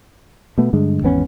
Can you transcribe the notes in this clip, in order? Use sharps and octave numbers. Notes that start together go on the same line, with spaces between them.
B2 A3 B3
G2 D3 G#3
G#1 E2 B3 C#4